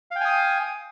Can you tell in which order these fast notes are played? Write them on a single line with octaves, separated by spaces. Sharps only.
F5 G5 G#5 D#6